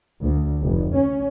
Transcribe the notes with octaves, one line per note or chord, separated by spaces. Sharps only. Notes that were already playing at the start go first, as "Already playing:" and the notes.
D2
F1
C#4